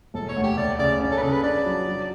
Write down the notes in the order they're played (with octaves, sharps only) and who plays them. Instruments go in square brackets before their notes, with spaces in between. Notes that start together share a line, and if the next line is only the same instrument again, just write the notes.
[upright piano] E1 [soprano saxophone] A4
[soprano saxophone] C#5
[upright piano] D2
[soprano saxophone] G4
[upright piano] D2 [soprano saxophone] D5
[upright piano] C#3 [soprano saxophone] D5
[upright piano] C#4
[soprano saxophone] A4
B4
[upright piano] C#3 [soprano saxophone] A4
[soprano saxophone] B4
[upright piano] D4 [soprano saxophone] D5
[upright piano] F#3
F#3